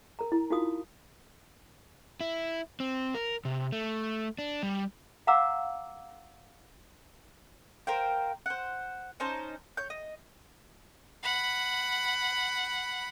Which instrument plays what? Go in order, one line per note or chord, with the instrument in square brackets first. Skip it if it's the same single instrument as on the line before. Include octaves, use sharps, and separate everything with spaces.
[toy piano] A#4 A#5
E4
D#4 F4 F#4 A#4 F5 D#6
[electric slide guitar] E4
C4
A#4
C3
A3
D4
G3
[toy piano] F5 F#5 A#5 D6 E6
[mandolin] A#4 C5 F5 G5
C5 F#5
C#4 D#4 C5 A5
C#5 G6
D#5
[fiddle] F#5 B5